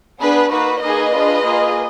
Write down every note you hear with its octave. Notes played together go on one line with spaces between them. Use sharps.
B3 D4 G#4 B4
A#3 D#4 F#4 B4
A#3 D#4 G#4 B4 D#5
D4 F4 G#4
A#3 F4 G#4